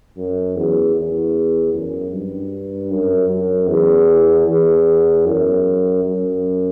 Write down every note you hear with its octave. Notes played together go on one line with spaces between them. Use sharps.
F#2
E2
E2
F#2
G2
F#2
F#2
E2
E2
F#2
F#2